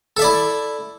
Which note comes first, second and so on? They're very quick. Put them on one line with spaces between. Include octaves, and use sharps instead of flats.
A4 E5 D5 E4